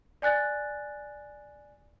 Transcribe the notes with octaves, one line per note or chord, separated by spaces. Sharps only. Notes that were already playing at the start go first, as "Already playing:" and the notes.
D5 G#5 F#6 A6